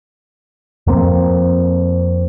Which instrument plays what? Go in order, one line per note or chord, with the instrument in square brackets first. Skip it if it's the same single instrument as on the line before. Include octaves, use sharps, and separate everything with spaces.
[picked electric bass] F2 A#3 C4